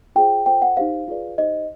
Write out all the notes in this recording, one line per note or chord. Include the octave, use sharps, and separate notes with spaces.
F4 G#4 C5 G5
F4 A4 C5 G5
F#5
D#4 G4 C5 F5
F4 G#4 B4 D5
D#4 G4 C5 D#5